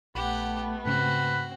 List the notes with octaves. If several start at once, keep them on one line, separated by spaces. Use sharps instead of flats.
A#1 A3 B3 G4 F#5 B5
G#2 C#3 C4 F#4 B4